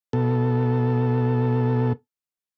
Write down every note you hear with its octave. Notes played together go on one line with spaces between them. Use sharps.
B2 A4